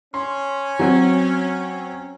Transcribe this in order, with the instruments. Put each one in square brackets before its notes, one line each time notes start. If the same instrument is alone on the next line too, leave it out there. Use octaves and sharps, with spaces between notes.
[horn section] C#4 [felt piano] C6
[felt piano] F#3 C4